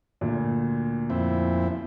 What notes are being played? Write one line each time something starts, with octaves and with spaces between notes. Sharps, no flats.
D2 A#2
F2 C4 E4